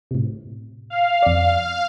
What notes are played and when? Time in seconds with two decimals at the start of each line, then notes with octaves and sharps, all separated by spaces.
0.11 A2 C3
0.90 F5
1.23 F2 D5